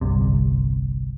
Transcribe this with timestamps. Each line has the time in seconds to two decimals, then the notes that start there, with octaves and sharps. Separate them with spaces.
0.01 G1 C2 C3